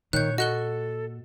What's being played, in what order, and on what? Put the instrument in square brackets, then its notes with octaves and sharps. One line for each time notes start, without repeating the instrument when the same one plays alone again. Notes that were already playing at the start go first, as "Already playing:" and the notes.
[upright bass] A#2 [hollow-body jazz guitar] D#3 [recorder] C#5 [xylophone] F#6 G6
[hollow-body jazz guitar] F#4 [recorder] A4 [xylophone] D#5 F#6 G7